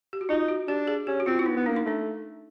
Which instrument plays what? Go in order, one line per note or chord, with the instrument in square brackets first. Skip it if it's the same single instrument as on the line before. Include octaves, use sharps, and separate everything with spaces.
[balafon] G4
F#4
[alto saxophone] D#4 [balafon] F4
[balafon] F#4
[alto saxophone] D4 [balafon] G4
[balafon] G#4
[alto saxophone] C#4 [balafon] G4
[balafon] F#4
[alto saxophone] C4 [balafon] F4
[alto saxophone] C4 [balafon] E4
[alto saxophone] B3 [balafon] D#4
[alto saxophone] B3
[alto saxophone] A#3 [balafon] D4
[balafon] D#4
[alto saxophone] A3 [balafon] D4